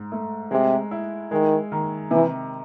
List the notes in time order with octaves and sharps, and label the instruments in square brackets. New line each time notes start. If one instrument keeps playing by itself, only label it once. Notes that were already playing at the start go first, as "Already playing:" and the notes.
Already playing: [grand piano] G#2
A3
[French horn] C3 [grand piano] G#3
[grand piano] E4
[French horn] D#3 [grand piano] G#3
[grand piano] D#3
[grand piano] C3 [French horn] E3